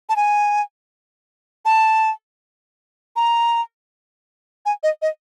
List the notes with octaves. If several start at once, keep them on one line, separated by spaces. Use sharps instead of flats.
A5
G#5
A5
A#5
G#5
D#5
D#5